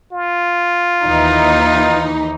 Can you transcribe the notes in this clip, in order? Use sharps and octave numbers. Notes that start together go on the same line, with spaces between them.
F4
D#2 E3 D#4